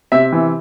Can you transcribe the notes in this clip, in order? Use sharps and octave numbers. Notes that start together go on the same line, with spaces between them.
C3 E5
E3